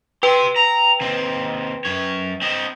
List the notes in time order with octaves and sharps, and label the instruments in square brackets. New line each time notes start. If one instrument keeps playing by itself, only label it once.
[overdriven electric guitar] G4 C6 [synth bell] B4 G5
[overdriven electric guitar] A#5
D#2 C4
F#2 C#5
C4 D#5